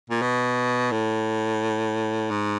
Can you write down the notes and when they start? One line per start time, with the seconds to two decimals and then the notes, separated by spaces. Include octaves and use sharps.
0.10 A#2
0.22 B2
0.91 A2
2.31 G#2